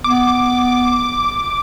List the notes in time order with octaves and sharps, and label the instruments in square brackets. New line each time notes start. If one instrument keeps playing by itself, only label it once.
[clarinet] B3 [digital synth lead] D6